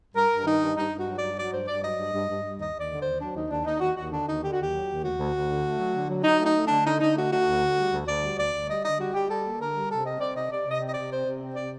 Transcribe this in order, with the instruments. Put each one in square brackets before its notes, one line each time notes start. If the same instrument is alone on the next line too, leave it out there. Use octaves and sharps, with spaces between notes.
[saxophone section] G2 A#4
G2
D#3 D#4
G2
G2 D#4
G2
F#4
F#3
G2 D5
F#3 D5
G2 C5
G2 D5
F#3 D#5
G2
G2
G2
G2
D#2 D#5
D#2 D5
D3
D#2 C5
F#3 D4
D#2 D#4
D#2 D4
D#2 D#4
D#2 F#4
D#2 F#4
D3 D4
D#2 D#4
D3 G4
F#4
D#2 G4
F#3
D#2
D2 F#4
D2
D2
D3
A3
F#3
D3
F#3
F#3 D#4
A3
D#4
A3
D4
D3
D3 D#4
D3 D#4
A3 F#4
A3 F#4
D2
D3
G3
D2
D2 D5
G3
D2 D5
D2
G3 D#5
D3 D#5
G3 F#4
G3 G4
G3 A4
A#3
D3 A#4
G3
C3 A4
C4 D#5
C4 D5
C3 D#5
C3 D5
C3
D#5
C4
D#5
C3 D5
C4 C5
C3
C4
D5
C3